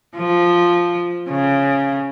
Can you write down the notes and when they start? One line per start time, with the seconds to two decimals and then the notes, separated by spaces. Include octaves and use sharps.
0.16 F3
1.29 C#3